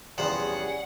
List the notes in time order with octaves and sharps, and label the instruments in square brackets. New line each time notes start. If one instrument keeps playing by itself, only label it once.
[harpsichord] E2 C3 F3 [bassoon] G3 [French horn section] C#4 G4 G#4 [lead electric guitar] F#5